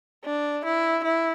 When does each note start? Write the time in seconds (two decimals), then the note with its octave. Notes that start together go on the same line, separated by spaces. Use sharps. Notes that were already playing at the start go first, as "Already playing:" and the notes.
0.25 D4
0.65 E4
1.04 E4